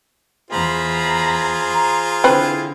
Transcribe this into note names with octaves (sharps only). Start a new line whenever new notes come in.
E2 F4 G#4 C5 A#5 B5
A#5
D3 C4 E4 B4